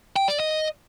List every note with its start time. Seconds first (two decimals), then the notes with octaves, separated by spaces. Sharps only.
0.16 G5
0.28 D5
0.40 D#5